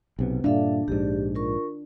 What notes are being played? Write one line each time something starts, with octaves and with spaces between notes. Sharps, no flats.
B1 C3 B3
G2 A#2 D4 A4 E5 F5
A#1 G#2 G4
F4 A#4 C#6